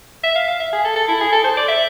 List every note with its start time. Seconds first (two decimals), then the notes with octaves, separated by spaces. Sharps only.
0.24 E5
0.35 F5
0.48 F5
0.60 E5
0.73 G#4
0.85 A4
0.96 A4
1.08 E4
1.21 G#4
1.32 A4
1.44 C5
1.57 D5
1.68 E5